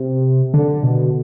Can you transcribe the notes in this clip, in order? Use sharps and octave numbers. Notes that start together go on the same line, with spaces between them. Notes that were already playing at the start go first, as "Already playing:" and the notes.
Already playing: C3
D3
B2